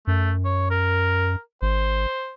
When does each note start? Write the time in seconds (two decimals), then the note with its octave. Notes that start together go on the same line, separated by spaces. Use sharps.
0.07 F#2 A3
0.45 C#5
0.71 A#4
1.62 G#1 C5